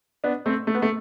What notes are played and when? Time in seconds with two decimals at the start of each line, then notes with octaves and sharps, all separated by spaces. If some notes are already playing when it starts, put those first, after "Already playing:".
0.24 B3 D4
0.46 A3 C4
0.67 A3
0.75 B3
0.82 A3